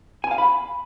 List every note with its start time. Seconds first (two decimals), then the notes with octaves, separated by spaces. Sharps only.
0.24 G#5
0.31 F5
0.38 B5